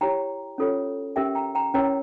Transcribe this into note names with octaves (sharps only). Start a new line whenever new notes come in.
E4 G4 C#5 G5 A#5
C#4 F4 A4 C#5
C#4 G4 A#4 E5 G5
G5 A#5
G5 A#5
C#4 E4 A#4 C#5 G5 A#5